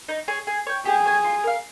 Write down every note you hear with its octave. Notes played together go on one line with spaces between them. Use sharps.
D#4
G#4 C#5
G#4
C#5 G5
G4 G#4
C#5 G#5
F4
A#4 F5